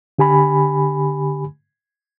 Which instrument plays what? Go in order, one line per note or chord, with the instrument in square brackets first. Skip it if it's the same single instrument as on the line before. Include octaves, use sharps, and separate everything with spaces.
[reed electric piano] D3 G4 G#5 B5